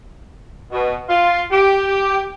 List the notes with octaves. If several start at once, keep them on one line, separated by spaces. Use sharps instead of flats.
B2
F4
G4